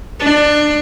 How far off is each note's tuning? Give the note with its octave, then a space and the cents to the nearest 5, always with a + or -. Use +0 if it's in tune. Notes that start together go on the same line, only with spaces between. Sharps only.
D4 +20